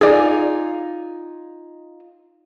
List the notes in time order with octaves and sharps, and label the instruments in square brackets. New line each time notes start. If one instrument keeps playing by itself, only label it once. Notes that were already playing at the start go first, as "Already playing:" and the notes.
[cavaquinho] D#4 F4 G#5 [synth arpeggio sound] G#4 D5